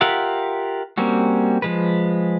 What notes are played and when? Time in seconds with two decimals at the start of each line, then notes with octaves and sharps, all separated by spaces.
0.01 F4 G4 A#4 E5 F#5
0.98 G3 A#3 C4 C#4 F#4
1.62 F3 G#3 B4